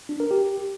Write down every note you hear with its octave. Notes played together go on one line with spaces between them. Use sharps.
D4
A#4
G4